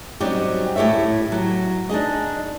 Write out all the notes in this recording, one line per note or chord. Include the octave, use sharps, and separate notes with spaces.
F#3 G3 C4 C#4 D#4 G4
A2 E4 G4 C#5 E5
F#3
D4 D#4 G#4 D#5